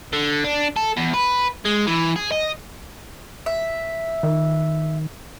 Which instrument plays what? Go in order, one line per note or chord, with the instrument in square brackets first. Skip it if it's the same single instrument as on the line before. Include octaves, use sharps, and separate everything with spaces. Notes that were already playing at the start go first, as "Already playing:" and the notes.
[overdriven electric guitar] D3
D4
A4
E2
B4
G#3
E3
G#4
D#5
[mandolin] E5
[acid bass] D#3